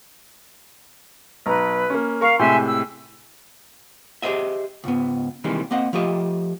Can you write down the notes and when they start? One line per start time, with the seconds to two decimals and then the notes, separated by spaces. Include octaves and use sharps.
1.46 B1 B4 A#5
1.90 A#3 C#4
2.21 A#4 F5 A#5 C#6
2.39 A2 C3 G#3 E5 G#5 C6
2.67 E6
4.22 G4 G#4 A#4 C5 D#5 E5
4.84 C#2 G#2 B3
5.44 C3 D#3 E3 G3 G#3 A#3
5.71 A#3 C4 D#5 F#5
5.93 F3 A3 G4 D#5